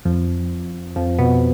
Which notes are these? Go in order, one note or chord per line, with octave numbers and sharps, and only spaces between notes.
F2 F3
F2 F3
B2 B3